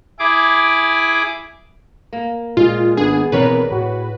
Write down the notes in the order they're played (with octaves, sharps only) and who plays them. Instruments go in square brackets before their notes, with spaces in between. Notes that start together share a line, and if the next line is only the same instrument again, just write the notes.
[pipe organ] E4 G#4 D6
[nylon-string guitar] A#3
[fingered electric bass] A#2 [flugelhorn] G#3 [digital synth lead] F4
[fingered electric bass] G#1 D4 [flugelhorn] B3 [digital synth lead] G#4
[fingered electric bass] B2 E3 C4 [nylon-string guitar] G#4 C#5 D5 [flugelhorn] A#4 [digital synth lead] B4
[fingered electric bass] A2 [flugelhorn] F#4